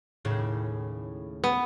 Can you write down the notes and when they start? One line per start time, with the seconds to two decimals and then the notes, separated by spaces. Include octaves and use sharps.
0.25 D#2 A2 C#3
1.44 B3